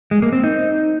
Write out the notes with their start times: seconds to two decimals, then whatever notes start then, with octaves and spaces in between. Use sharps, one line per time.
0.11 G#3
0.22 A#3
0.33 C4
0.44 D#4